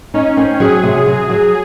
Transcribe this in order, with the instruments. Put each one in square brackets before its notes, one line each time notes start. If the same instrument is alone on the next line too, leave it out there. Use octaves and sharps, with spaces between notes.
[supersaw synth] C#4 [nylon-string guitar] D#4
[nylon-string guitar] C4
[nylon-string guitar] F#3 [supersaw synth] G#4
[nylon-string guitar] C3
F#3
F#3